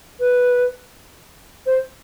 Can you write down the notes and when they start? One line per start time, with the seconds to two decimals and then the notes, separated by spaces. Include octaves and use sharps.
0.20 B4
1.66 C5